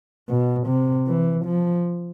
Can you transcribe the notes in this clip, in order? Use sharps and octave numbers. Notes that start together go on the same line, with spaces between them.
B2
C3
E3
F3